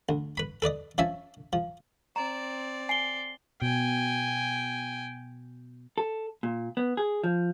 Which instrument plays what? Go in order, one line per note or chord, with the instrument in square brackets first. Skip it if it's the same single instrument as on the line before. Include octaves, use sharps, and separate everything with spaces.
[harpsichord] D2
B4 B5
A4 B4 D5 D#5
F3 C#4 E5 G#5 A5
F3
[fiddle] C4 D5 [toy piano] A#5
[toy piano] G#5 [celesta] C7 G7
[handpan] B2 [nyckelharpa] G5 G#5
[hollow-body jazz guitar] A4
A#2
B3
G#4
F3